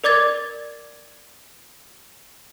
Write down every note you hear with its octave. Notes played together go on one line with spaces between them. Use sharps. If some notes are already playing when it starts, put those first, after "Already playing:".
A#4 D5 D6 G#6 A6